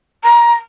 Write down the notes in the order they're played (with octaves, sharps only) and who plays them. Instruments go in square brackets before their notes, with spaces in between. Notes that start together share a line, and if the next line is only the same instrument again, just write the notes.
[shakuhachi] A#5